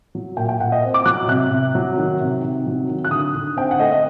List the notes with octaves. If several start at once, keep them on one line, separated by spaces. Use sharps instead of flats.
F#3
A#2 G5
G5
A#2 F#5
D#5
C4
D6
F#3 F#6
C3 F#6
C3
F#3
D#3
C3
C3
F#3
D#3
F#6
D3 D#6
D3
C4 G5
F#5
A3 D#5
D#5